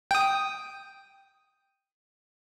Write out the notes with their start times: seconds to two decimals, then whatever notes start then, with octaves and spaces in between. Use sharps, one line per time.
0.11 G5 D#6